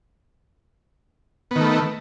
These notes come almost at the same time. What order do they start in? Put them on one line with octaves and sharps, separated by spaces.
B3 D#3 A3